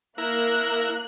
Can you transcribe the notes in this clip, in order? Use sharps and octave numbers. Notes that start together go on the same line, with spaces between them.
A#3 E4 A#4 F#6